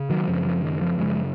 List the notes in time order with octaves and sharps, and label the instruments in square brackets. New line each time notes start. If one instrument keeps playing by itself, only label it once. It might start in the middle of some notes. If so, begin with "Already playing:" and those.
Already playing: [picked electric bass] C#3
D#3 F#3
F#2 C#3 F3
F3
D#3
F3
F#2 C#3 F3 G#3